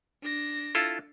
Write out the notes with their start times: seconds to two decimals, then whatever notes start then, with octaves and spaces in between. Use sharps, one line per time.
0.23 D4 A#6
0.75 E4 F4 A4